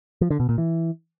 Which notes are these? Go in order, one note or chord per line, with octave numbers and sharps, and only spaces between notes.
F3
D3
B2
A#2
E3